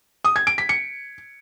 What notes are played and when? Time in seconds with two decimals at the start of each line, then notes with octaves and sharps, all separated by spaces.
0.25 D#6
0.36 G#6
0.47 D7
0.58 B6
0.69 C#7